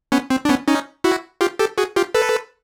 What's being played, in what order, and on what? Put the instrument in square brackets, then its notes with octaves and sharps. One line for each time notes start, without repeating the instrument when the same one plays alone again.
[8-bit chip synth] B3 C#4
C4
D4
B3 C#4
C#4 D#4
E4 F#4
F4 G4
G4 A4
F#4 G#4
F4 G4
A4 B4